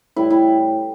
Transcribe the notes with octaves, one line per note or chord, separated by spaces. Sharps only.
A2 E3 G3 E4
E4